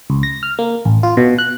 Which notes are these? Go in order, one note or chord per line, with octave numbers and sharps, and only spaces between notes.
C#2
A#6
F6
A#3
A1
F4
B2
F#6